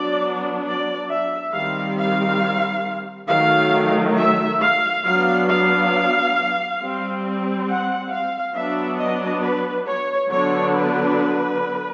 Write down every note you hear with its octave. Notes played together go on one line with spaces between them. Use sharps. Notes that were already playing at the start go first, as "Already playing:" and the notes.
Already playing: F#3 B3 D4 D5
D5
E5
D#3 G3 C4 F5
F5
D#3 F#3 A3 F5
E5
F5
F#3 B3 D4 F5
F5
G3 C4
F#5
F5
F#3 B3 D4 E5
D#5
B4
C#5
D3 F#3 B3 D4 C#5
B4